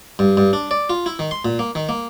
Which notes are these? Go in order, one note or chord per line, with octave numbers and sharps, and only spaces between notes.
G2
G2
D4
D5
F4
E4
D#3
C6
A#2
A#3
D#3
A#3